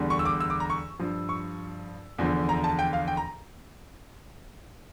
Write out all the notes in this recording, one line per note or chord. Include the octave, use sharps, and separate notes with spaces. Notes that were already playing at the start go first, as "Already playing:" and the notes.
Already playing: E2 D3 G3
C#6
E6
D6
E6
D6
A#5
C#6
G2 F3
C#6
E2 D3 F3
A#5
A5
G5
F5
G5
A#5